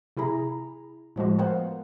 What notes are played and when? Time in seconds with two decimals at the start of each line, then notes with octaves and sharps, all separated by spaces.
0.17 C3 E4 G#4 A#5 B5
1.16 A2 F3 G#3 F#4
1.38 B3 A#4 C5 F5 F#5